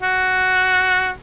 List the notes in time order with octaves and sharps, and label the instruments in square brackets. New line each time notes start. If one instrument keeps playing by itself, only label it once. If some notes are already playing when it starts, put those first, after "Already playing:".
[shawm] F#4